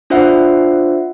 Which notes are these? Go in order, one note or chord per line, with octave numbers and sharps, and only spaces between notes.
D4 F4 C5 E5 F#5